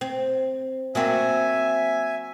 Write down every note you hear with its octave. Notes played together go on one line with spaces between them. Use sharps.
C4
F#3 A#3 C4 E5 G#5